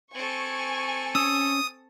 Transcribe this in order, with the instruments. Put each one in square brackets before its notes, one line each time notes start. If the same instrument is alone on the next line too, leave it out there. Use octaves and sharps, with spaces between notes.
[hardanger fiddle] C4 A4 [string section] G#5 C#6
[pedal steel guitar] C#4 E6 [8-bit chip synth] D#6